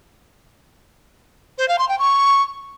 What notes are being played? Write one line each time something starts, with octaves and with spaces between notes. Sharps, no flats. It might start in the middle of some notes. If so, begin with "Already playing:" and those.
C5
F5
C6
G5
C#6